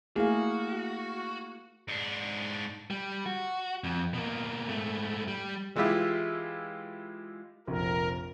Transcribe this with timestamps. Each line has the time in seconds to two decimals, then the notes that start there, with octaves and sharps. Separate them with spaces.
0.16 A3 A#3 E4 F#4 G#4 F5
1.88 G#2 D4
2.90 G3
3.26 F#4
3.84 F2
4.14 B2 A#3
4.69 G#2 A3
5.28 G3
5.76 E3 G#3 E4 F4 G4 E5
7.67 F1 A#1 A#4